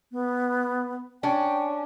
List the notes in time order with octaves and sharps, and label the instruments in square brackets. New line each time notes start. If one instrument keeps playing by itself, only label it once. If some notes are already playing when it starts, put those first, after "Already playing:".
[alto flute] B3
[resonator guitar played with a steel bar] C#4 D4 [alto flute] G5